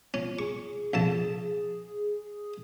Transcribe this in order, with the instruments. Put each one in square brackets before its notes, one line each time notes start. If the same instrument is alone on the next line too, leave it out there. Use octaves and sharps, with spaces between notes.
[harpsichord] C#4 [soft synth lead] F4
[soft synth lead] G#4 [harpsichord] C#6
[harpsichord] A#1 F2 A5